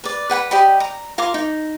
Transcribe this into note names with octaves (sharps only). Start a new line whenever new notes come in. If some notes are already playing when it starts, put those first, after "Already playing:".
B4 D5
B4 F#5 G5 B5
G4 D5 D#5 B5
A#5
F4 A#4 A#5 D6
D#4